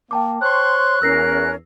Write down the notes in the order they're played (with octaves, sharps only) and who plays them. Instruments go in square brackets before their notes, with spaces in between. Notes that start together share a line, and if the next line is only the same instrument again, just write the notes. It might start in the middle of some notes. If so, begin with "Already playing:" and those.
[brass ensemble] A#3 [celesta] G5 A5 D6
[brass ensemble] C5 C#5 [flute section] C6 C#6 [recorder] F#6
[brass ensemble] E2 [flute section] C#4 A#4 [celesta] E6 A#6 C7